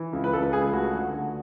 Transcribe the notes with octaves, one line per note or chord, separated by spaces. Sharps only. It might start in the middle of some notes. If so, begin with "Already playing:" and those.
Already playing: E3
C#2
B4
C#2 A4
B4
C#2 G#4
A3 F#4
D3
A3